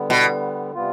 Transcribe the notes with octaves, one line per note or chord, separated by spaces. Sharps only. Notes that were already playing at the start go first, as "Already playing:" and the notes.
Already playing: D3 G3 B3
B2
C3 G3 B3 F4